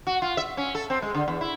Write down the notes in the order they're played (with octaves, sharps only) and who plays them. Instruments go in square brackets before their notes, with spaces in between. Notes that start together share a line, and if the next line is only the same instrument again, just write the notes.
[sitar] F#4
F4
E5
C#4
A4
C4
G#3
D3
E2
E4